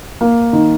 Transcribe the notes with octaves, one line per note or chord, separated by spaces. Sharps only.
A#3
D#3